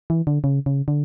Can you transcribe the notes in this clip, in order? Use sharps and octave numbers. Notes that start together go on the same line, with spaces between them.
E3
D3
C#3
C#3
D3